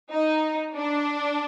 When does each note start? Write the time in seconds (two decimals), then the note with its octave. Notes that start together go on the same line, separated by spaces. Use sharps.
0.11 D#4
0.76 D4